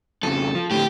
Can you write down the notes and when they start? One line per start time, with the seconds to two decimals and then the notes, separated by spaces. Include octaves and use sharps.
0.23 F2 C#3 A4
0.55 F3
0.71 A2 D3 G4